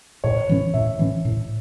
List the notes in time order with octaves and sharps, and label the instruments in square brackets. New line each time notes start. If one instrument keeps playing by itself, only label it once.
[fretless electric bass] A2 [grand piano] C#5
[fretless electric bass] E3 C#4
[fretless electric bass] A2 [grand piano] E5
[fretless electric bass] E3 C#4
A2